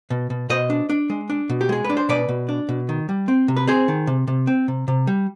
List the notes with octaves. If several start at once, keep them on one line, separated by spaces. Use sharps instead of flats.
B2
B2
B2 C5 D#5
D4
D4
G#3
D4
B2
G4
G#3 G#4
B4
D4
C5
B2 B4 D5
B2
D4
B2
D#3
G3
C4
C3
B4
C4 G#4 C5
D#3
C3
C3
C4
C3
C3
G3